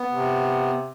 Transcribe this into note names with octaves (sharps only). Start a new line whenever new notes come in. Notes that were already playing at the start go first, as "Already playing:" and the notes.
Already playing: B3
C3